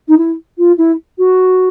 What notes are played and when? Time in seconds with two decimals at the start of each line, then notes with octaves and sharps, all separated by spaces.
0.08 D#4
0.18 E4
0.58 F4
0.78 E4
1.18 F#4